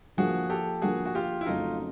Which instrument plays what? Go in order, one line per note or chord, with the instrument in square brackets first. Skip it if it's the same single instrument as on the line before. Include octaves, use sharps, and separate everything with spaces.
[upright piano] D3 F3 A#3 [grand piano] F#4 G#4
[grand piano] G4 A4
[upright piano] D3 F3 A#3 [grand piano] F#4 G#4
[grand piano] F#4
F4 G4
E4
[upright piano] F2 C#3 F#3 A3 C#4 [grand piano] D#4 F4